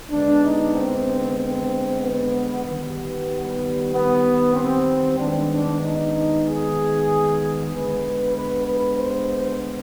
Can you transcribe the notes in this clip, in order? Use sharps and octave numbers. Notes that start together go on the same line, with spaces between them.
D3 G#3 B3 D4
D#4
C4
C4
B3
D#3 G3 B3
B3
C4
D#3 G#3 B3 D4
D4
D#4
G#4
D3 G#3 B3 B4
B4
B4
C5